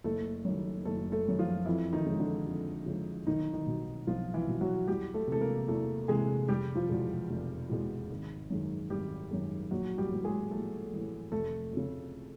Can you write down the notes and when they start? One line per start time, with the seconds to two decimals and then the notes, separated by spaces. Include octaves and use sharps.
0.04 F#1 A3 A4
0.45 F#2 D#3 G3
0.85 F#1 A3 A4
1.12 A3 A4
1.25 F#2 D#3 G3
1.39 F3 F4
1.66 F2 E3 E4
1.93 D#3 D#4
2.06 C#3 F3 G#3
2.20 D3 D4
2.46 F2
2.86 C#3 F3 G#3
3.27 B1 D#3 D#4
3.53 D#3 D#4
3.67 B2 G3
4.07 B1 F3 F4
4.34 E3 E4
4.48 B2 G3
4.61 F#3 F#4
4.88 E2 G3 G4
5.14 A3 A4
5.28 C3 E3 G#3 A4
5.41 A#3 A#4
5.68 E2 A3 A4
6.08 C3 E3 G#3 G#4
6.48 F1 G3 G4
6.75 F3 F4
6.89 E2 B2 G#3
7.29 F1
7.69 E2 B2 G#3
8.10 G#1
8.50 F#2 D#3 G#3
8.90 G#1 G3 G4
9.31 F#2 D#3 G#3
9.71 A#1 F#3 F#4
9.98 G3 G4
10.11 A2 E3 G3
10.24 G#3 G#4
10.51 A#1 A3 A4
10.92 A2 E3 G3
11.32 F1 A3 A4
11.72 F2 C#3